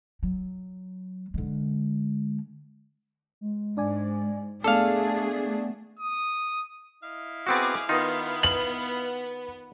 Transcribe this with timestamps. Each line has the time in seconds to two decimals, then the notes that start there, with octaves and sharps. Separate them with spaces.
0.23 F#3
1.34 D3 G#3
3.41 G#3
3.77 G#2 D4 D5 G#5
4.64 A3 B3 D4 G#4 A4 D5 F5 A5
5.99 D#6
7.03 E4 D#5 F5
7.47 B3 C4 F#4 G#4 D6
7.89 D#3 B3 D#4 F4
8.43 F#7